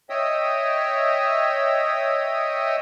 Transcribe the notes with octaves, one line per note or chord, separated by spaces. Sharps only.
C#5 D#5 E5 G5 D#6 E6